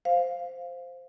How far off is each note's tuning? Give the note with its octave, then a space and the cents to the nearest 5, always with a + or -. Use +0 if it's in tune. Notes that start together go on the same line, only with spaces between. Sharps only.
C5 +0 F5 +0